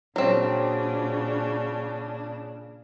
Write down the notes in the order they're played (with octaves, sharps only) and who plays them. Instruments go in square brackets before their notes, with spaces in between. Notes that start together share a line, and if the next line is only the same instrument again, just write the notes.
[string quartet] A#2 C#3 D4 [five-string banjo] F#3 C4